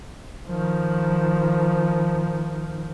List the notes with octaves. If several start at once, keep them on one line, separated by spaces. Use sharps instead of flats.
D#3 F3